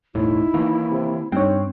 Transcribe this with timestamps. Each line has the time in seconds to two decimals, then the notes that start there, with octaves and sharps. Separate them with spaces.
0.15 E1 C2 A2 D#4 E4
0.54 D#3 E3 A#3
0.92 C3
1.32 G2 C4 D#4 C#5